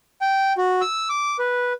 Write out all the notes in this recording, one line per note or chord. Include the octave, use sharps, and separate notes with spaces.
G5
F#4
E6
D6
B4